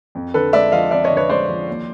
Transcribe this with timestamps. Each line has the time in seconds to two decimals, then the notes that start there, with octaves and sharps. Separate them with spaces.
0.15 F2
0.34 D3 A4 B4
0.53 G#3 D5 E5
0.72 F3 D#5 F5
0.91 F2 D5 E5
1.04 C#5 D#5
1.10 D3
1.17 B4 C#5
1.29 G#3 C5 D5
1.49 F3
1.68 D#2